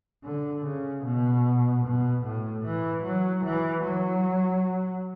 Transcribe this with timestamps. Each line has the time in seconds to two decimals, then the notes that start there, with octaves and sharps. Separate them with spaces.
0.24 D3
0.65 C#3
1.05 B2
1.85 B2
2.24 A2
2.65 E3
3.04 F#3
3.45 E3
3.83 F#3